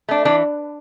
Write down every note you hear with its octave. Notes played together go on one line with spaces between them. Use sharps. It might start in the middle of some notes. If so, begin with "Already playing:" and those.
A3 D4
E3 D4